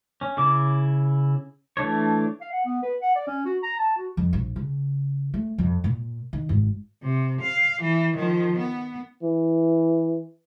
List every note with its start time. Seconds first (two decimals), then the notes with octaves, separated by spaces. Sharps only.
0.21 C#4
0.37 C#3 E4 D6
1.77 E3 A3 D4 C#5
2.41 F5
2.53 F#5
2.66 B3
2.83 B4
3.02 F#5
3.15 D5
3.27 C#4
3.46 F#4
3.63 A#5
3.79 A5
3.97 F#4
4.17 F2
4.33 A#1
4.56 C#3
5.34 A3
5.58 F2
5.84 A#2
6.33 D#3
6.49 G#1
7.02 C3
7.41 F5
7.81 E3
8.16 D#3 F3
8.58 B3
9.23 E3